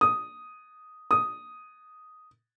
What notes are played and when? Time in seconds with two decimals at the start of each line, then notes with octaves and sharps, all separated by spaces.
0.01 D#6
1.11 D#6